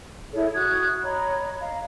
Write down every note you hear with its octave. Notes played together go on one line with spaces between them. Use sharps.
E4 G#4 A4 C#5
F#4 D#6 F#6 G#6
C#5 D#5 A#5 B5
D#5 F5 A#5